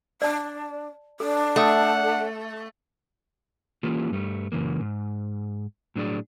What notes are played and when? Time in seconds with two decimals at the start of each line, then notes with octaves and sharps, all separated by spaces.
0.22 D4 D5 A5
1.20 D4 A4
1.56 A3 E5 F#5 C#6 D#6
3.83 E3 A#3 C#4 E4 F4 G4
4.12 G2 G3 A3
4.52 F#2 C#3 E3 A#3
4.80 G#2
5.96 A2 F#3 D4 G#4 D5